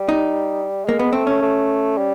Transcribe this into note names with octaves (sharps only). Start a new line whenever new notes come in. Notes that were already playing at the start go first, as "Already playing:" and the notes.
Already playing: G3
D#4
G#3 A#3
B3
A3 C4
C#4
A3
G3